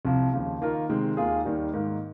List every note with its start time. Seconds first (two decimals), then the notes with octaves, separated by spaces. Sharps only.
0.05 C2 C3 F3
0.33 D#2 C#3 F3
0.61 D#3 A#3 F4 A#4
0.89 C3 D#3 G#3 C4
1.17 D#2 D#3 A#3 F4 G#4
1.45 D#2 D#3 G3
1.73 G#2 D#3 A#3